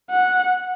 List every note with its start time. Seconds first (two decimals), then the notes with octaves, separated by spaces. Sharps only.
0.11 F#5